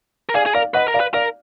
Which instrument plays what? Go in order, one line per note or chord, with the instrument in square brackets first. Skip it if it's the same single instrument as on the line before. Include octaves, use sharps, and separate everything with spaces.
[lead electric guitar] A#4
[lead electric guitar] G#4 [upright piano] D5 F5
[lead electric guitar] G#4
[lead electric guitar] A#4 [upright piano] D5 F5
[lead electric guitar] B4 [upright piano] D#5 F#5
[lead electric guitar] A#4
[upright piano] D5 F5
[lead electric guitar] B4
[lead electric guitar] A#4 [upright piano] D5 F5